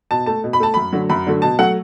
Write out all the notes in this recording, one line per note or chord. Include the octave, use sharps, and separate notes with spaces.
B2 A5
A3 A5
B2
B5
A3 A5
F#2 B5
D3 F#3 A3
F#2 B5
D3 F#3 A3
B2 A5
F#3 A3 F#5